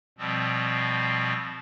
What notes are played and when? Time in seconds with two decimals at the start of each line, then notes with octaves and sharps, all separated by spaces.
0.18 B2 F3 G3 C4